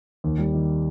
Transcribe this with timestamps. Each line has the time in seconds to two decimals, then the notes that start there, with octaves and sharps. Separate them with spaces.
0.24 D#2
0.38 G3
0.54 D#3